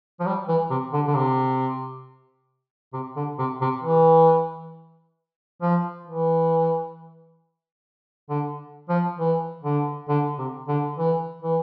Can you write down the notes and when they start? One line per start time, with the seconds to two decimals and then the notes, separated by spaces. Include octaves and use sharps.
0.20 F3
0.26 G3
0.48 E3
0.71 C3
0.93 D3
1.07 D3
1.16 C3
2.94 C3
3.16 D3
3.39 C3
3.61 C3
3.84 E3
5.62 F3
6.07 E3
8.30 D3
8.89 F3
9.19 E3
9.64 D3
10.09 D3
10.38 C3
10.68 D3
10.98 E3
11.43 E3